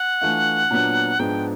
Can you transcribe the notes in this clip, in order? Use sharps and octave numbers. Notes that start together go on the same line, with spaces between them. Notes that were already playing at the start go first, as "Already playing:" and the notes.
Already playing: F#5
E3 A3 D4 F4
A#2 F#3 B3 D4
G#2 F3 G#3 B3 D4 G5